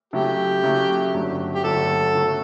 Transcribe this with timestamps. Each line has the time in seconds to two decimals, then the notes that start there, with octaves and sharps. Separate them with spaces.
0.13 C#3 F#3 A3 E4 G4
0.63 C#3 F#3 A3 E4
1.14 G1 G2 F#3 A3
1.55 G4
1.64 G1 G2 F#3 A3 A4
2.15 C#3 F#3 A3